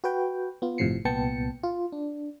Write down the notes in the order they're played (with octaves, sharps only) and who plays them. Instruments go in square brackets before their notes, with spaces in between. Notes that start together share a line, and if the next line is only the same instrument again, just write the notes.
[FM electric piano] F#4 B4 G5
B3 F4
G1 A2 C3 F3 C7 C#7
C2 A#2 B3 G5 A5 C#7
F4
D4